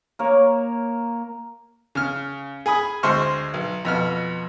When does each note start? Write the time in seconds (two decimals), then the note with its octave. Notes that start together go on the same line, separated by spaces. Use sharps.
0.19 A#3 A#4 C#5
1.95 C#3 F6
2.66 G#4 G#5 B5 D#6
3.03 D2 G#3 C5 C6 C#6 F6
3.54 B1
3.85 F2 B2 F6